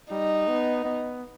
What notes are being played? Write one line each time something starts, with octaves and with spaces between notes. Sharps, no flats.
G3 D#4
B3
B3